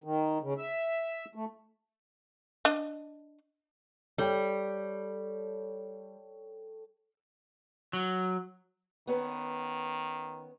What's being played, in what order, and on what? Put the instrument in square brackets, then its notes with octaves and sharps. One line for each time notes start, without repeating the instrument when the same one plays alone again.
[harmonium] D#3
C#3
E5
A3
[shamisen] D4 D#5
[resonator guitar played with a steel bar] G3 [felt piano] A4 C#5 G5
[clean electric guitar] F#3
[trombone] D#3 [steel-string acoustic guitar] B3 C#4 B4